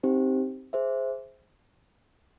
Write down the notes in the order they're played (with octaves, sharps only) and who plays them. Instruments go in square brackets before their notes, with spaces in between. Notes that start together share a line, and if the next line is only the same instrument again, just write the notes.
[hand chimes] C4 D#4 G4 C5
G#4 C5 E5